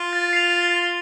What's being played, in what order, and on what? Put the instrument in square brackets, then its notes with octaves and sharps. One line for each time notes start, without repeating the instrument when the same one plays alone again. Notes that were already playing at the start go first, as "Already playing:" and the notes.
Already playing: [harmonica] F4
[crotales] A6
C7 F7